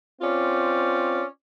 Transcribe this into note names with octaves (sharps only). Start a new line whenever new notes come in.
C4 C#4 F4 D5